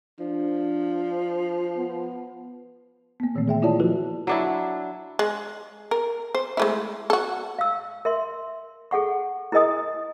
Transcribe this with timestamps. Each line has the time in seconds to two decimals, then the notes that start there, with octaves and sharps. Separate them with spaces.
0.19 F3 D4
1.77 B3
3.20 A#3 B3
3.35 A#2 D#3 E3 A3 C4
3.48 G#4 E5 G5
3.62 A#3 E4 F4 C#5 D5 A5
3.80 F3 E4 F#4 A4 B4
4.27 F#3 D4 E4
5.19 G#3
5.91 A#4
6.35 C5
6.57 G#3 A3 E4
7.10 F#4 A4
7.59 F5 E6
8.05 A#4 E5 C6
8.91 G#4 A4 F#5 C#6
9.52 E4 G#4 A#4 D#5 G#5 D#6